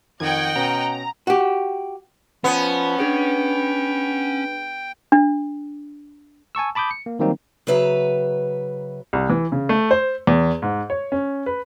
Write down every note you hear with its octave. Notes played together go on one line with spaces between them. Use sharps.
F2 D#3 D#5 F#5 G5 G#6
B2 C#4 B4 A#5
F#4 G4
F3 B3 C#4
D4 G#4 B4 G5
D4
G#5 A5 C#6 E6
A5 B5 D6 D#6 G6
C#7
A#3
D#3 F#3 G3 A#3 C4 D#4
C#3 F#3 B4 E5 A#5
C2
E3
C#3
A3
C5
E2
G#2
C#5
C#4
B4